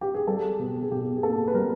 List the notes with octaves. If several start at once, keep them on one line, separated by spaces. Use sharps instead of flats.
G4
G#4
G3 A4
B2
G#4
B2 G4
G#4
A#3 A4
B4
G3 A#4